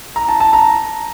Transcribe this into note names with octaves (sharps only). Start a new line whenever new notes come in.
A#5
A5
A5
A#5